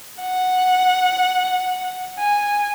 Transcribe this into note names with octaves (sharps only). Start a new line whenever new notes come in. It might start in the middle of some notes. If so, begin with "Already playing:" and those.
F#5
G#5